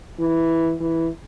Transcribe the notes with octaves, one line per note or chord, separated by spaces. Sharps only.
E3
E3